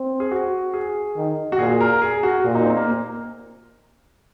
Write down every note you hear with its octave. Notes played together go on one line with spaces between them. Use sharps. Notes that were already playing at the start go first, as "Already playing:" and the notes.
Already playing: C4
G#4
F#4
G#4
D#3
F#4
A#2 G#4
A#4
G#4
F#4
A#2 F#4
D#4
C4
A#3